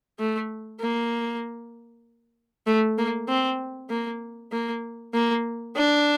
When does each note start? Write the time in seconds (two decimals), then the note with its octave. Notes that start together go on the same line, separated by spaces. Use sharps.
0.19 A3
0.81 A#3
2.67 A3
2.98 A#3
3.28 C4
3.90 A#3
4.52 A#3
5.14 A#3
5.76 D4